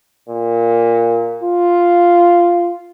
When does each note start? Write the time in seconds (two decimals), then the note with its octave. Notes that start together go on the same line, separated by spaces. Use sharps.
0.29 A#2
1.43 F4